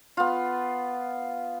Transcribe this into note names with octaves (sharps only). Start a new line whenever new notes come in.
B3 F4